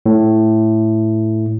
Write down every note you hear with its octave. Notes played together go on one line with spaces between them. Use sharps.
A2